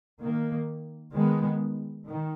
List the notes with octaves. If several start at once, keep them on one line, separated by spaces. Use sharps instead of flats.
D#3 A#3
D#3 G#3 B3
D#3